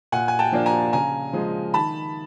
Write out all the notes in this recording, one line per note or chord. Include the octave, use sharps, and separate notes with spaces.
A#2 F#5 G#5
G#5
G5 A5
F3 A#3 D4
G#5 A#5
C#3 G#5 A#5
F3 G#3
D#3 A5 B5